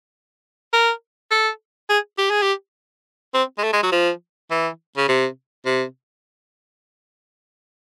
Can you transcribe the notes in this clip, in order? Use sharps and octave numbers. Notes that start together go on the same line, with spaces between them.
A#4
A4
G#4
G4
G#4
G4
C4
G#3
A3
G#3
F#3
F3
E3
C#3
C3
C3